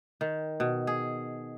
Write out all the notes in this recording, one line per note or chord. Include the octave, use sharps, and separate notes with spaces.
D#3
B2
G#4